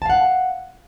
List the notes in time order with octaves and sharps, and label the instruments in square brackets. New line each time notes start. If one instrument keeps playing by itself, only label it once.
[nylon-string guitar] A5
F5
F#5